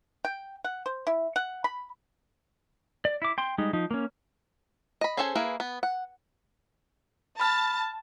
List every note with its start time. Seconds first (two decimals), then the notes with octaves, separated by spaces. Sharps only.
0.25 G5
0.64 F#5
0.86 C5
1.07 E4
1.36 F#5
1.64 B5
3.05 D5
3.22 E4 D6
3.38 G5 C6
3.58 G3 G#3 D#4
3.73 F3 D#4
3.91 A#3 C#4
5.01 D#5 B5
5.17 C#4 G#4 A4 C5 G#5
5.35 A#3 E4 G#4 B4
5.60 B3
5.83 F#5
7.40 A5 B5 F6